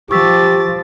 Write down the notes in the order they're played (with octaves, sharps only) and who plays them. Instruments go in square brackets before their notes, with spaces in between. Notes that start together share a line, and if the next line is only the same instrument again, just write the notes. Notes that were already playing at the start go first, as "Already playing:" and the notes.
[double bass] F3 [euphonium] G4 [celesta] C#6 E6 B6 [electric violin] D6 A6